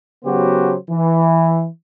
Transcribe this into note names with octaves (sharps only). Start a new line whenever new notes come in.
C#3 F#3 B3 F#4 G4 C5
E3